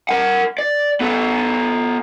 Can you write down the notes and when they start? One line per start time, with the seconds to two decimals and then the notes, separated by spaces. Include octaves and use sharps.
0.09 A#4 F#5
0.58 D5
1.00 B3 A4